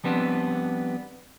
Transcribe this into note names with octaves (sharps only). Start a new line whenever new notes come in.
F3 G3 B3 C4 D4